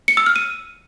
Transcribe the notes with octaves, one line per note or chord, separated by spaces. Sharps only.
C#7
E6
F6
D#7